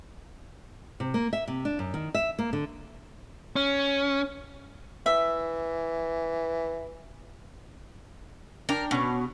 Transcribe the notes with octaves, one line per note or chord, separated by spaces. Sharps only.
C3
A#3
E5
C3
D4
F#2
D#3
E5
A#3
D3
C#4
E3 E5
D4 A#4 G5
B2 C#4 C#5